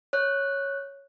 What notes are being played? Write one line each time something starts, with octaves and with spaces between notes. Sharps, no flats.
C#5 F#6